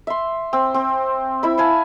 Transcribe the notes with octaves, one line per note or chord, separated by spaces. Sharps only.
E5 C6
C4
C4
E4 E5 B5
E5 F5 G#5 A5